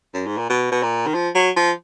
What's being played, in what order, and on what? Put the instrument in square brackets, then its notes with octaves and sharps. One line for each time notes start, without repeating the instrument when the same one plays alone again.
[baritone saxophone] F#2
G#2
A#2
B2
B2
A#2
D#3
F3
F#3
F3